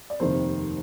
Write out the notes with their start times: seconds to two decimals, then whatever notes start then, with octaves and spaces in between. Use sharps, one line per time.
0.10 D5
0.20 F1 D#2 D#3 C5